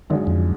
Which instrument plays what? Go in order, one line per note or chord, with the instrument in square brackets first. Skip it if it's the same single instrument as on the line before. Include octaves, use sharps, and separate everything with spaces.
[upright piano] G#1 F#2 D3 G#3 [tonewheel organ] D#3
[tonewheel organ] F2